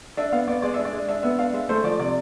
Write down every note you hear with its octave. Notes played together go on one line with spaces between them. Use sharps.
D4 E5
B3 F5
B3 D5
G#3 D5
D4 E5
D5
G#3
D4 E5
B3 E5
D4 F5
G#3 E5
A3 C5
F3 D5
C3 D5